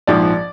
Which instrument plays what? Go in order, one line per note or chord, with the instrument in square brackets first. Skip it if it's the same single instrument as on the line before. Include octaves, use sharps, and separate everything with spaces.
[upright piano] A#1 G#2 F3 D5